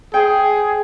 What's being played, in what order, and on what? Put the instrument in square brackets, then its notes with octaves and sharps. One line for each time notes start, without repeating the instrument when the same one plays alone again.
[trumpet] G#4 [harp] C5 G5